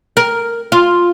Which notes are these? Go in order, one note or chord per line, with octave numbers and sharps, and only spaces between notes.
A#4
F4